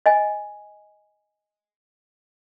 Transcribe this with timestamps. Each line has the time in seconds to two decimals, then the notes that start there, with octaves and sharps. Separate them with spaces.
0.06 D#5 G#5